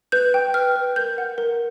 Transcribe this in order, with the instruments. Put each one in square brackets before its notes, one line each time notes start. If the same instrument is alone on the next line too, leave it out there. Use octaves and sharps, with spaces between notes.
[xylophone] B4 G6
G5
B4 F6
B4
A#4 G6
F#5
A#4